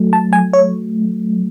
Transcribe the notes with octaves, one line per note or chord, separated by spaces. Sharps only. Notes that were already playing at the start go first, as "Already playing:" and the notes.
Already playing: F#3 A3
A5
G#5
C#5